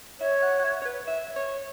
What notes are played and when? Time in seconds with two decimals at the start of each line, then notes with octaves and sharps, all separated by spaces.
0.20 C#5 E5
0.42 F#5
0.59 F#5
0.64 E5
0.82 C#5
0.85 B4
1.07 E5
1.36 C#5